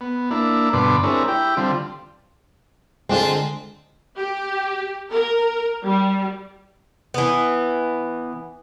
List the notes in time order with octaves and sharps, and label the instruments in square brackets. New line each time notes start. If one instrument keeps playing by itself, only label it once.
[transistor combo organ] B3
A#3 D4 E4
G2 B2 D3 B4 C6 D6
G#3 C4 D4 E4 A#4 C#5
E4 G4 G5
D3 G3 C4 F4
[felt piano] D3 G#3 [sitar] C4 D4 F4
[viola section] G4
A#4
G3
[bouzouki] E3 B3